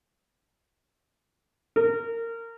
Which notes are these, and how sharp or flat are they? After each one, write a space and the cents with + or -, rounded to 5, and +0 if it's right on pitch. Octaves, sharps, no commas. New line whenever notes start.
A#4 -20